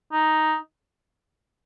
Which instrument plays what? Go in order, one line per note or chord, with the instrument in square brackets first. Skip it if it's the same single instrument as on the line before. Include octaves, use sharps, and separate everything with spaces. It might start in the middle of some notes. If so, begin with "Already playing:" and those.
[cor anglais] D#4